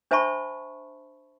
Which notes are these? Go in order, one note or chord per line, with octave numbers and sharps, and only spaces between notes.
D4 C5 E5 A5 B5 C#6